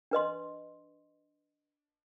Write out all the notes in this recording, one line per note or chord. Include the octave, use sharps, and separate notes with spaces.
D4 B4 D#5 C6